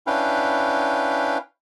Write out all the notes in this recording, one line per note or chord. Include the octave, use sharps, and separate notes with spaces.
C#4 D4 E4 B4 F5 G5